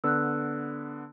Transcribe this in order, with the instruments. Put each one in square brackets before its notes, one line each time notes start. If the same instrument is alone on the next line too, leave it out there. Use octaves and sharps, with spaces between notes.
[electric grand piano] D3 B3 [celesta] E6 F#6